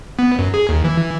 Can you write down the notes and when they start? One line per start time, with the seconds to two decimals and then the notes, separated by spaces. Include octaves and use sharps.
0.19 B3
0.39 F#2
0.54 G#4
0.69 D#2
0.84 E3